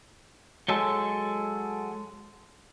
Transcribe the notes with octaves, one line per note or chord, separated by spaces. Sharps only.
F#3 G#3 A4